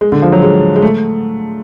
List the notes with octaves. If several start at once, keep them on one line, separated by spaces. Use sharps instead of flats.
G#3
D3
F3
F#3
G#3
G#3
A3